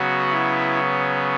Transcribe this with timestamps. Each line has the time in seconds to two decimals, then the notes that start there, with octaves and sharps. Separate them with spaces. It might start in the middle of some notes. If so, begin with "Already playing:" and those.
Already playing: C#3 F#3 B3 F#4
0.31 E4